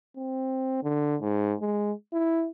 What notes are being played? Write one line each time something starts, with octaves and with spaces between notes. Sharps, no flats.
C4
D3
G#2
G#3
E4